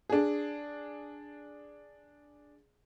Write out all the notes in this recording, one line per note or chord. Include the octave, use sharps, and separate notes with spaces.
D4 G#4